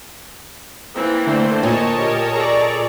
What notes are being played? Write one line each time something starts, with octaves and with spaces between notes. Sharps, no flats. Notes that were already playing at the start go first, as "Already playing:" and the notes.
E3 A#3 C4
D3 A3 C5
A#2 C#5 D#5 A5
G4 A#4
G#4 A4 D5 A#5 C#6